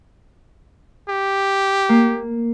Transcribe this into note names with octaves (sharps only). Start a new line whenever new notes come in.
G4
A#3